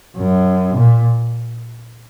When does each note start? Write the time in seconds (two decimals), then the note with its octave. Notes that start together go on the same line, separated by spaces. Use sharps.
0.17 F#2
0.76 A#2